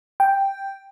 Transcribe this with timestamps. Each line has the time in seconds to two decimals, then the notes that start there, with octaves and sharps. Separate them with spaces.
0.20 G5